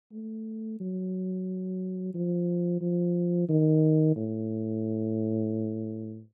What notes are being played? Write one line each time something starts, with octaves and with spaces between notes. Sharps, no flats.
A3
F#3
F3
F3
D#3
A2